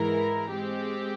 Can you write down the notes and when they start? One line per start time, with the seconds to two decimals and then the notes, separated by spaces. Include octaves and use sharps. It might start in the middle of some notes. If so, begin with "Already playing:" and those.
Already playing: G#2 E3 G#3 E4 A#4
0.51 G#3 C4 G4